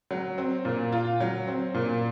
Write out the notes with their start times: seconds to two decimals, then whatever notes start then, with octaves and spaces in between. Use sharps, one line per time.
0.11 F#3
0.38 C4
0.65 A#2
0.92 F4
1.21 F#3
1.47 C4
1.74 A#2